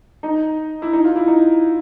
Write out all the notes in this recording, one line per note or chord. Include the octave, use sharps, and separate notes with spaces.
D#4
E4
D#4
F4
E4
D#4